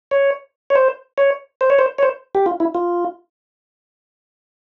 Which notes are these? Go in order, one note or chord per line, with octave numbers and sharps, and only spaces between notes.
C#5
C#5
C5
C#5
C5
C#5
C5
C#5
C5
G4
F4
E4
F4